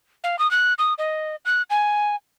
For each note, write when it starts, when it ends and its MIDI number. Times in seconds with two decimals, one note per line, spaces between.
0.24 0.39 77
0.39 0.50 87
0.51 0.74 90
0.78 0.94 87
0.98 1.36 75
1.45 1.62 90
1.70 2.15 80